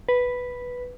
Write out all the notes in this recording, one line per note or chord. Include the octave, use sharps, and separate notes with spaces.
B4